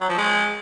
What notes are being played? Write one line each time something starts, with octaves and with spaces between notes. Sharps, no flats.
F#3
F3
G#3